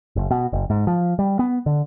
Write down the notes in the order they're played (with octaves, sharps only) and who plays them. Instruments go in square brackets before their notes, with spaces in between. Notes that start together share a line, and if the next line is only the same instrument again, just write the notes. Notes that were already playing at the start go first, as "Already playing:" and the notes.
[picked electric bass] F#1
B2
F#1
G#2
F3
G3
B3
D3